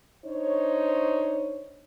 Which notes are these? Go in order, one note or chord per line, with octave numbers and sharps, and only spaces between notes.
D4 D#4 C5 C#5